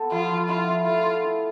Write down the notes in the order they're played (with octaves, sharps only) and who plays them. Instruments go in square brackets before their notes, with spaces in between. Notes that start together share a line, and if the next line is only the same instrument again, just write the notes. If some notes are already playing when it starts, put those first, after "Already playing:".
Already playing: [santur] B3 A4 C5
[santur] F3 [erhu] F4
[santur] F3
[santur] E4 [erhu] F4
[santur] E4
[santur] A3 [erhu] F4
[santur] A4
E4